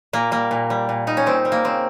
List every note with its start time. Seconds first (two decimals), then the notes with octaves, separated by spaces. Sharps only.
0.13 A#2 A#3
0.31 G3 A#3
0.51 A#2
0.70 G3
0.89 A#2
1.07 G3 D#4
1.17 C#4
1.26 A#2 C4
1.45 G3
1.52 A#3
1.64 C#3 C4